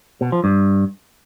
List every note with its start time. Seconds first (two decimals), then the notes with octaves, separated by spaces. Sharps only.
0.21 B2
0.32 F3
0.44 G2